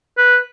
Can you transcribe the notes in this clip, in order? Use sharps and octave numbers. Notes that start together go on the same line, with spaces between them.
B4